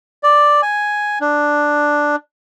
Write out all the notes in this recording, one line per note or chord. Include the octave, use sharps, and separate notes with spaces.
D5
G#5
D4